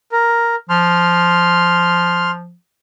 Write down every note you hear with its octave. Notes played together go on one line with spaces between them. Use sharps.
A#4
F3 C6 F6